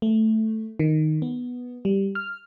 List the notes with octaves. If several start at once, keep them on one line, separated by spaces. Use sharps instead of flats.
A3
D#3
B3
G3
F6